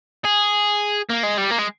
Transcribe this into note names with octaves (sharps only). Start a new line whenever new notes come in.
G#4
A#3
G#3
G3
A#3
G#3